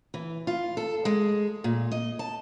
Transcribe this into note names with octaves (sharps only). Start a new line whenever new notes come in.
E3
F4
A4
G#3
A#2
D#5
A5